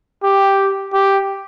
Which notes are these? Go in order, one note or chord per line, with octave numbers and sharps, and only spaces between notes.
G4
G4